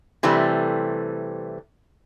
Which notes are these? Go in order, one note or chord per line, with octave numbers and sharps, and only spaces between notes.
C3 E3 G3 A3